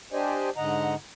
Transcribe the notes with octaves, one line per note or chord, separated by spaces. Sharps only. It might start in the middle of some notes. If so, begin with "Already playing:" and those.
D4 G4 C5 D5 D#5 G#5
G#2 D3 D#5 F#5 A#5